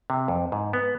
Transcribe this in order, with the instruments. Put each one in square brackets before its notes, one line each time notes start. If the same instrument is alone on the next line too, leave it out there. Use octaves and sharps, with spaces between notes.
[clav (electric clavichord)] C3
F2
G#2
B3